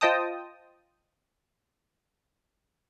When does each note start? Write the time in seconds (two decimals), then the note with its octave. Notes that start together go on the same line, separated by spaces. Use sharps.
0.01 F4 C5 D#5 G5 A5 D#6